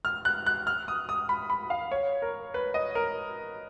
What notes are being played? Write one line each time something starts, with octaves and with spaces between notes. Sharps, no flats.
F6
F#6
F#6
F6
D#6
D#6
B5
B5
F5
C#5
A#4
B4
D#5
A#4